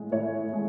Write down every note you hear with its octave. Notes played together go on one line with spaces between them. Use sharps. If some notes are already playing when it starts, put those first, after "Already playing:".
Already playing: A2 G#3
A2 C#5
G#3